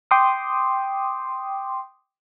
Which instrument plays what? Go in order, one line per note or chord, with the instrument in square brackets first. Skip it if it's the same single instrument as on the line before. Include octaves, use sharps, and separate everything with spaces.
[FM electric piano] G5 C6 D6 D#6